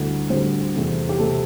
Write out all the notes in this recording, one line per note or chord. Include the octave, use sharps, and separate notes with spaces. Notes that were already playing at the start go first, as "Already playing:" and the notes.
Already playing: D2 D3 G3 E4
D2 D3 G3 C4 C5
E2 C3 A3 C4
G4
C3 A3 C4 A4